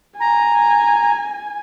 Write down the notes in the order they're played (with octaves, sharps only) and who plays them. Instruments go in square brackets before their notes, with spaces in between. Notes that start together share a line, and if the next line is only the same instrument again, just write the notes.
[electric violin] G#5 [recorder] A#5